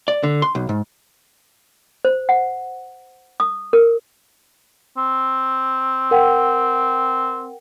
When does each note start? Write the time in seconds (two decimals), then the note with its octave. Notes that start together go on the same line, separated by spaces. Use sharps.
0.08 D5
0.23 D3
0.42 C6
0.55 B1
0.69 G#2
2.05 C5
2.29 F#5
3.40 D#6
3.73 A#4
4.97 C4
6.11 A#4 F#5 G5